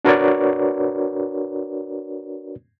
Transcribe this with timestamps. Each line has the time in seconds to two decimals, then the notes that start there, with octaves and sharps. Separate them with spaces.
0.05 D4 F#4 A#4 B4 C#5 D5